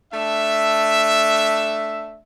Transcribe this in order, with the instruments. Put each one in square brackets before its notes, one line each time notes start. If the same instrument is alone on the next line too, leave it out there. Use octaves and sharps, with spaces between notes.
[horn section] A3 D4 E5